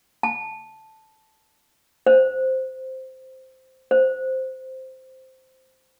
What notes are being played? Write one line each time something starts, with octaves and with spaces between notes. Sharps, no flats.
A5
C5
C5